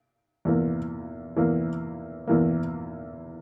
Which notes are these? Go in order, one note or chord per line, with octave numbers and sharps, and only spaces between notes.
E2 E3 A#3
E2 E3 A#3
E2 E3 A#3